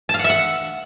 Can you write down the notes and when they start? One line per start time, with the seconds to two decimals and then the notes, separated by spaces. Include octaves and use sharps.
0.09 A5
0.14 F5
0.19 F#5
0.24 E5
0.29 F#5